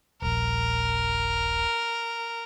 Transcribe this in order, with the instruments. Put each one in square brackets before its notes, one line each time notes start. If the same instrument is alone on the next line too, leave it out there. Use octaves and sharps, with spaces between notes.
[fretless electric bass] D#1 A#1 [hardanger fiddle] A#4